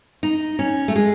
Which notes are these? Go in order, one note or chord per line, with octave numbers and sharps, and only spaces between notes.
D#4
C#4
A3
G#3